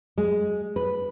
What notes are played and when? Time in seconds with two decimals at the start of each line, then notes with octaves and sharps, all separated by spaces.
0.18 G#3
0.76 B4